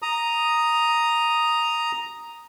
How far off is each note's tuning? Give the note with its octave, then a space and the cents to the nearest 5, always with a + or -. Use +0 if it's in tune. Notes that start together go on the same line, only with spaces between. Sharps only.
A#5 +0 D#6 +0